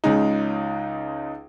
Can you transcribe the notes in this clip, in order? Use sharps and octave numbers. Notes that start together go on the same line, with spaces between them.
C#2 C#3 G#3 D#4